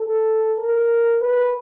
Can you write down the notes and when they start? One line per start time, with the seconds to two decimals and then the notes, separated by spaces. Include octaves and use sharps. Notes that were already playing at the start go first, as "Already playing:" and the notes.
Already playing: A4
0.58 A#4
1.21 B4